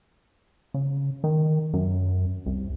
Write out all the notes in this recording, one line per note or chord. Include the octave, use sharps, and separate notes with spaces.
C#3
D#3
F#2
C2